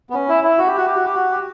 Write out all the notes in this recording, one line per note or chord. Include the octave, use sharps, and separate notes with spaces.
B3
C#4
E4
E4
F#4
G4
F#4
G4
F#4
G4
F#4
G4